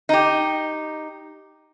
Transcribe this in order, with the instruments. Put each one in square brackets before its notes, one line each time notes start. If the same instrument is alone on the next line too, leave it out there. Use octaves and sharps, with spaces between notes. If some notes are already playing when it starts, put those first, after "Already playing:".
[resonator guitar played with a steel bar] D#4 G4